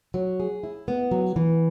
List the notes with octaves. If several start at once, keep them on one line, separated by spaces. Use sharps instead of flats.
F#3
G#4
E4
B3
F#3
E3